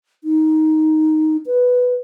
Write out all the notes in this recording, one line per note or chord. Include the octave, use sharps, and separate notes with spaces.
D#4
B4